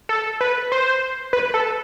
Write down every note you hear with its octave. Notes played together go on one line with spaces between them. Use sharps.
A4
B4
C5
B4
A4